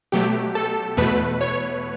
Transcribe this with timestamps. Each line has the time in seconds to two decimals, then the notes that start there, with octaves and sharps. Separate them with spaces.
0.12 B2 F#3 A3 G4
0.55 A4
0.97 E2 B2 A3 B4
1.41 C#5